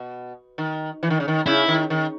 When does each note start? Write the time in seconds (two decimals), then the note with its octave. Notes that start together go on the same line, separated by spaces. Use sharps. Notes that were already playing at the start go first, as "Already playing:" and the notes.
Already playing: B2
0.58 D#3
1.03 E3
1.10 D#3
1.20 C#3
1.28 D#3
1.46 C#3 E4
1.68 D#3
1.90 D#3